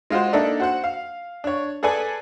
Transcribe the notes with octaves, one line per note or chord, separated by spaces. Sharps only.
G#3 F4 F#4 C5
A#3 D4 D#4 A4 D5 E5
F#4 C5 F#5
F5
D4 C#5
G#4 A4 B4 D5 G#5